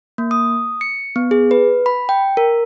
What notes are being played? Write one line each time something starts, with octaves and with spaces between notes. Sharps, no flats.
A#3
D#6
C#7
B3
G#4
B4
B5
G5
A#4